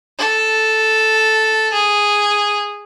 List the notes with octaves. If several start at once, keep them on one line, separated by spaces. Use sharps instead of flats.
A4
G#4